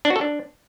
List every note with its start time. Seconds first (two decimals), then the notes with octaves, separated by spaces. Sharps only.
0.05 D4
0.10 F#4
0.16 A4
0.21 D4